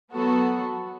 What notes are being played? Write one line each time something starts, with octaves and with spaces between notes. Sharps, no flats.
F#3 B3 F#4 A4